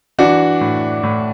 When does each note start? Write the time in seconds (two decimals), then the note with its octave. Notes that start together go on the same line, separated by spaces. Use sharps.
0.18 E3 D4 F#4
0.61 A2
1.03 A2